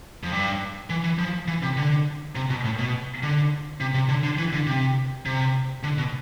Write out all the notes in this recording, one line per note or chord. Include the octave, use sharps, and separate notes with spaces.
F2
G2
E3
E3
F3
E3
C3
D3
C3
B2
A2
B2
D3
C3
C3
D3
D3
E3
D3
C3
C3
D3
B2